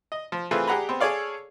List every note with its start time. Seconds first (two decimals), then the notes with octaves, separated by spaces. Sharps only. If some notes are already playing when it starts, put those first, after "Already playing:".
0.12 D#5
0.32 F3
0.51 E3 A3 C4 F4 G#4 B4
0.67 G4 G#4 F#5 A#5 B5
0.89 B3 C4
1.00 G#4 A4 C#5 D5 F5